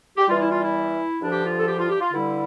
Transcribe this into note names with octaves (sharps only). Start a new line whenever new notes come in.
G4
E2 E3 G3 F4
E4
F4
E4
G2 D3 F3 D4
G4
F4
A4
G4
F4
G4
F4
G2 D3 G3 E4